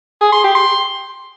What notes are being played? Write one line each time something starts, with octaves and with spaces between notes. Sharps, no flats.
G#4
C6
G4
C6